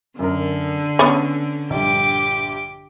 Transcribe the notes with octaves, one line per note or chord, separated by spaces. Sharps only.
F#2 D3 A#4
B3 C#4 A4 C#5 D#7
A#1 G2 G4 D6